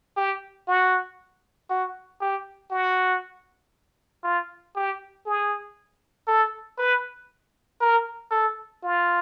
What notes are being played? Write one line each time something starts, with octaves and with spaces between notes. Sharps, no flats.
G4
F#4
F#4
G4
F#4
F4
G4
G#4
A4
B4
A#4
A4
F4